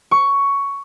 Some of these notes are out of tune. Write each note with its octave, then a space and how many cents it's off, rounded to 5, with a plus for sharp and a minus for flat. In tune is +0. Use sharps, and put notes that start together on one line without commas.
C#6 +10